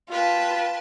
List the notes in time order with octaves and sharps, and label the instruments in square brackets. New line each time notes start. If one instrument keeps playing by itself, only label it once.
[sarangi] F4 [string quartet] B4 G5 A5